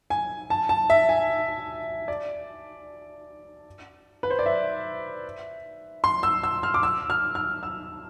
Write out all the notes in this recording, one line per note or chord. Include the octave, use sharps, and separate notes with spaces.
G#5
A5
A5
E5
G#5
D5
B4
C5
D5
E5
C6
E6
E6
F6
D6
E6
F6
F6
E6